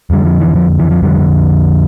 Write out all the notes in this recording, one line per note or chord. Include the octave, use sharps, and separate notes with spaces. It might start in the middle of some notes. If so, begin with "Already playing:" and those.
F2 D3 G3
F3
E3
F3
E3
F3
F2 D3 G3